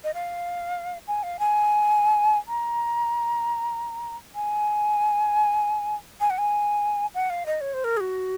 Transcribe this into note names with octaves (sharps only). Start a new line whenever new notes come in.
D#5
F5
G#5
F5
G#5
A#5
G#5
G#5
F#5
G#5
F#5
F5
D#5
C#5
C5
A#4
G#4
F#4